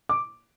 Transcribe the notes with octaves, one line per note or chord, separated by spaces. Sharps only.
D6